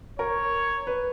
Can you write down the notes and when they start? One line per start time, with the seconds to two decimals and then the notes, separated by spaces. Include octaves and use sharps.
0.19 A#4 C#5
0.87 B4